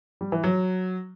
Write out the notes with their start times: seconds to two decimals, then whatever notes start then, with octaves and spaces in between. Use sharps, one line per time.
0.21 G3
0.32 E3
0.44 F#3